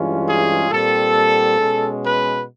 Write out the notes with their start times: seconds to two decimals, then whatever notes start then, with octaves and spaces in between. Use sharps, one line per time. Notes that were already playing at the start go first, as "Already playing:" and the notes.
Already playing: G2 E3 G#3 C#4 F4
0.28 G#4
0.71 A#2 G3 C4 A4
1.59 B2 G#3 C#4
2.03 B4